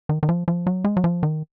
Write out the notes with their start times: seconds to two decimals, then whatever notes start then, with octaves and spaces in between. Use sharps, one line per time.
0.09 D#3
0.23 D#3
0.29 F3
0.48 F3
0.67 F#3
0.84 G#3
0.97 F#3
1.04 F3
1.23 D#3